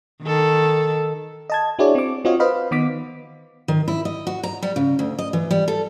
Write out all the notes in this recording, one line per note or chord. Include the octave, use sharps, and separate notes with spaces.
D#3 A4
D#5 A5 G#6
D4 E4 F#4 G#4 C#5 D5
C4 D6
C4 F4 F#4 C#5 D#5 F5
B4 C5 D#5 F5 B5
D#3 B3 D6 B6
D#3
E4
D#5
F#4
A#5
G3
C#3
D2
D#5
E3
G3
A4